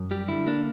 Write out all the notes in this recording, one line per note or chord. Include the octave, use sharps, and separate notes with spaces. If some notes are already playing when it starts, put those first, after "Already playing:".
Already playing: F#2
G3 G4
D3 E4
A#3 D4